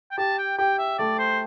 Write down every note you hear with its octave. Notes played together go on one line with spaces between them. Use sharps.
G5
G4 A5
G5
G4 G5
E5
A3 D5
C5